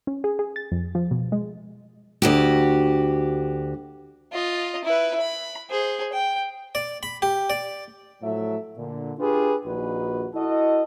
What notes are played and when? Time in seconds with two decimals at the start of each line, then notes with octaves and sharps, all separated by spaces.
0.07 C#4
0.24 G#4
0.39 G#4
0.56 A6
0.72 F2
0.95 F3
1.11 B2
1.32 G#3
2.22 D2 F#4 G4
4.32 F4 D#5
4.84 E4 B4
5.20 B5
5.70 G#4 C5
6.13 G5
6.75 D5
7.03 B5
7.22 G4
7.50 D5
8.22 A2 F3 F#3 A4 E5
8.77 A#2 D3
9.19 D4 F4 G4 G#4 B4
9.66 A#1 D#2 A#2 D#4 F#4 B4
10.35 E4 F#4 A4 D#5